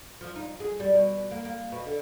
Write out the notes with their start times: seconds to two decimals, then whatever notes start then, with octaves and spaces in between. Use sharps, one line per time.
0.21 F3
0.36 D#4
0.60 G#4
0.80 G3
0.92 B2
1.31 A#3
1.45 A#3
1.72 B2
1.86 D3